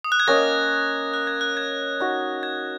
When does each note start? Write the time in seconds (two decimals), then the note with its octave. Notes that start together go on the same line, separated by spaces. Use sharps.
0.04 D#6
0.12 F#6
0.20 G#6
0.27 A#3 C#4 A#4 D#5 A#6
1.14 F#6
1.27 G#6
1.41 F#6
1.57 G#6
2.00 D#4 F#4 D#5
2.43 G#6